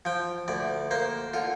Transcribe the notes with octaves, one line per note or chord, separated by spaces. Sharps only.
F3 G5
D2 D5
A#3 C5
D3 F4